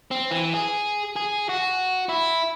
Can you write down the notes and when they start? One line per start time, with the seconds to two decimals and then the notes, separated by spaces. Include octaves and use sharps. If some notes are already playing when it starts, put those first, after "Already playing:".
0.11 C4
0.31 E3
0.54 G#4
1.16 G#4
1.49 F#4
2.09 E4